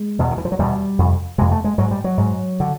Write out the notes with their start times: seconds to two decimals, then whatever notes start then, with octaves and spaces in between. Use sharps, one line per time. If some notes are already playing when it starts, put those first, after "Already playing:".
Already playing: G#3
0.19 E2 B2
0.31 D#3
0.38 E3
0.45 F3
0.52 F#3
0.59 E2 B2 G3
0.99 F2 C3
1.38 F2 C3 G#3
1.51 A3
1.64 G#3
1.78 G#2 F#3
1.91 G3
2.04 F#3
2.17 G#2
2.60 D3